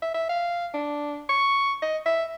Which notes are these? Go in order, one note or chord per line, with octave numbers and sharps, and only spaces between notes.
E5
E5
F5
D4
C#6
D#5
E5